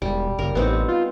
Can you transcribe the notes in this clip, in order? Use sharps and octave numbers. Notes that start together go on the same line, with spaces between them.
E1 G3
F#1 A#4
A1 B3 C4 D#4
F4